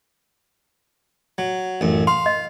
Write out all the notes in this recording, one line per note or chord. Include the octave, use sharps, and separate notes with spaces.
F#3
A1 F#2
F5 C6
D#5